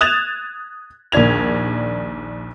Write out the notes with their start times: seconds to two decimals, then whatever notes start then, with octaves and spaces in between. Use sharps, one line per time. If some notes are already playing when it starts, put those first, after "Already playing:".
0.01 D#6 F#6 G#6 A6 E7 F7
1.12 A#1 D#2 D4 G#6 F7